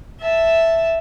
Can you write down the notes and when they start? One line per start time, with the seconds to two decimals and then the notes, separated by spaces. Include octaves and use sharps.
0.20 E5 A5